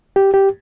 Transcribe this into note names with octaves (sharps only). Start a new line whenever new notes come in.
G4
G4